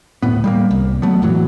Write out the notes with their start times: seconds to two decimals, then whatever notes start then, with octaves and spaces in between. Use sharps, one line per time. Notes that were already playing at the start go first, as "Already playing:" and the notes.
0.22 D1 A2 B3
0.44 G3 G#3 A#3
0.71 C2
1.02 F#3 A3 B3
1.22 F2 A2 E3 F#3